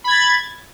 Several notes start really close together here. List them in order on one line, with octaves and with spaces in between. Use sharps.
B5 G#6 A6